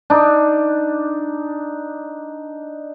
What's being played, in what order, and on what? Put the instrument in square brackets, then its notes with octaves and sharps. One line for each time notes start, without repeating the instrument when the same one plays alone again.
[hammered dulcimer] D4 D#4